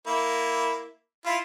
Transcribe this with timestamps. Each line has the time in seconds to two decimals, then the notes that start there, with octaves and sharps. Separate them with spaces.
0.07 A#3 E4
1.26 E4 F4